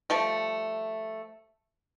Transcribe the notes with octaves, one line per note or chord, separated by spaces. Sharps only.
F3 G3 A3